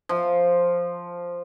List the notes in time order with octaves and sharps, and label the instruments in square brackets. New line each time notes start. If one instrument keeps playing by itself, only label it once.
[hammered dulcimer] F3